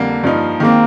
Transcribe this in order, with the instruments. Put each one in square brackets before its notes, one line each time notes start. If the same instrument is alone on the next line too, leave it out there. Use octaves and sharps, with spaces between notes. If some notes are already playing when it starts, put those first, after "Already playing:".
Already playing: [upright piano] F2 D3 G3 A#3
G2 F3 A#3 D#4
[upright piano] D#3 G#3 C4 [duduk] A#3